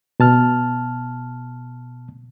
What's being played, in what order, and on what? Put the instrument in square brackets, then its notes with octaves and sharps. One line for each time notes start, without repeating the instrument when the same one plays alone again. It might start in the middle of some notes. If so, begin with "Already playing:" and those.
[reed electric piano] B2 A5 F6